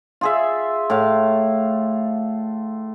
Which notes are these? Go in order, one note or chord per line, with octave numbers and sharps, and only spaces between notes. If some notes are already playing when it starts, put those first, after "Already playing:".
F4 G#4 E5
A2 F5